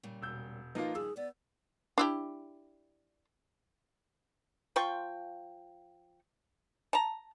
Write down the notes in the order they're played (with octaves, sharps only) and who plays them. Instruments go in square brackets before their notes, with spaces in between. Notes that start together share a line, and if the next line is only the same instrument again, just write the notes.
[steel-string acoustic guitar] A#2 C#3 G3
[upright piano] E1 E6 G6
[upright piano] F3 A#3 F4 [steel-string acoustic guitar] D#4 B4 D#5
[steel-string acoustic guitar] A#2 D#3 G3 [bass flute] G#4 [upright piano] E6
[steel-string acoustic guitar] B3 [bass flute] D5
[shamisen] D4 E4 G4
[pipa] F3 F4 G5 C#6
A5 A#5